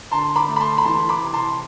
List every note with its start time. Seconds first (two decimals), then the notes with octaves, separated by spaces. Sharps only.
0.11 D3 A5 C6
0.36 B5 D6
0.48 A3
0.56 B5
0.60 A5 C6
0.78 B5
0.85 E3 A5 C6
1.09 B5 D6
1.22 C3
1.33 A5 C6